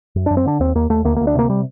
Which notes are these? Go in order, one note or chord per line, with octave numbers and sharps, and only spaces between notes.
F#2
F#2 D4
C4
D3 D4
D#2 C4
D#2 A#3
D#2 A3
D2 A#3
A#3
D2
D4
C3 A#3
G3